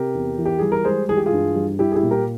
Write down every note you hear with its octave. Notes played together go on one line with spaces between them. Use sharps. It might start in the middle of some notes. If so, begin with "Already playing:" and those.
Already playing: C3 G4 A#4
E2
E3
G4
G3 G#4
A#4
G#3 G#4 C5
E3 G#4
G4
F4 G#4
G2
G3
G3 E4 G4
G#4
E4 G4
A#2
G4 A#4